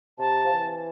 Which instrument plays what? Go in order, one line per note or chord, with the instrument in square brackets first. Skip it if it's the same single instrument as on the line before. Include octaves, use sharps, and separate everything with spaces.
[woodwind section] C3 [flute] A5
[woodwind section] F3
E3